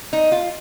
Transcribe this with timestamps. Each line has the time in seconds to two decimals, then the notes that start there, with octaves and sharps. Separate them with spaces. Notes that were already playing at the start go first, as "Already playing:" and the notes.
0.13 D#4
0.32 F4